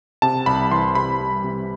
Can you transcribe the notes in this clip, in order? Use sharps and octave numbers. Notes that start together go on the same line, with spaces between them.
C3 A5
C2 B5
E3 C6
C3 B5
G3
C3